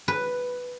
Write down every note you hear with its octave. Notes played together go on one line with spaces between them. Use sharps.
B4